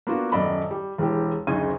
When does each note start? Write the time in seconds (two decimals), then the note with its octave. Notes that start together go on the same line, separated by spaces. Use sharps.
0.07 A#3 B3 D4 F4 F#4
0.32 D#1 F#2 D5 D#5 B5
0.71 G3
0.98 E1 E2 G4
1.47 F#1 D2 C#3 D#4 G#6 D#7